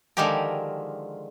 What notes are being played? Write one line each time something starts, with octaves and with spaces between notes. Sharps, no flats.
D3 D#3 F3 G#3 G4 A#4